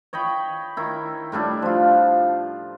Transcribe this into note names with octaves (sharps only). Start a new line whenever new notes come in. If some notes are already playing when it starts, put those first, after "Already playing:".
C#5 D#5 G5 B5
D#3 E4
A2 G3 D4 E4
F3 F4